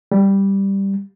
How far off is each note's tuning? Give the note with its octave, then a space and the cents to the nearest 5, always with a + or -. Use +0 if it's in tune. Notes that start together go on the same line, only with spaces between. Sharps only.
G3 +5